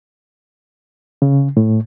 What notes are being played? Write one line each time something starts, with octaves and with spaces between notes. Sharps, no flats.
C#3
A2